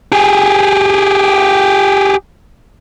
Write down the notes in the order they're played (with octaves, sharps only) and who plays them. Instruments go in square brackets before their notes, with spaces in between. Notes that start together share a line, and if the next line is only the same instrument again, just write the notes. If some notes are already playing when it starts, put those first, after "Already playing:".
[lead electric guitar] G4 G#4